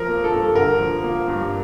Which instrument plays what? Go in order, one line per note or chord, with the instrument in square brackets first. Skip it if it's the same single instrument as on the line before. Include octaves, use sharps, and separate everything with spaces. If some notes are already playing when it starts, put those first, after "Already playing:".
Already playing: [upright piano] F3 A#4
A#3
A4
G2
D3 A#4
F3
A#3
G2